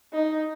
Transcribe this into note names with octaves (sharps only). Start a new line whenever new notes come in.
D#4